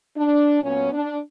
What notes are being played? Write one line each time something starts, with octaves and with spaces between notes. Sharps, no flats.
D4
A#2 F#3 B3 C#4
D4